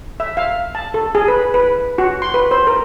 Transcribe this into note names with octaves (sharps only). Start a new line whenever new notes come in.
E5
F5
A5
A4
G#4
B4
B4
F#4
C6
B4
C5
A#4